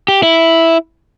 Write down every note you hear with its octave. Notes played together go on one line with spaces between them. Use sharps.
G4
E4